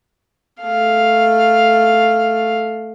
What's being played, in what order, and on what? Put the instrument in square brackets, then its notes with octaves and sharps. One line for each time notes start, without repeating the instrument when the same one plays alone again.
[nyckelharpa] A3 F5